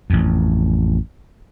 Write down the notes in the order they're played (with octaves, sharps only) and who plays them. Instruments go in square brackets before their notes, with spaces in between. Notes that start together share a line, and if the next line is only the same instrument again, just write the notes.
[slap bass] A1 F2